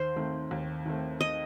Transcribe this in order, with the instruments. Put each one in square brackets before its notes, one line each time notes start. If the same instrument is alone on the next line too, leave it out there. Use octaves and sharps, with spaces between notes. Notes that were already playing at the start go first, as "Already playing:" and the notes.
Already playing: [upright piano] D#2 [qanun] C5
[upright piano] D#3 A3 C4
D#2
D#3 A3 C4
[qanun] D#5